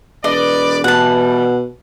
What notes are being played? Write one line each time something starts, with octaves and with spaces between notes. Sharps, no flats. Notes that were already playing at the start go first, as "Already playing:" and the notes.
E1 B4 D5 D#5
B2 E3 G3 F#5 A5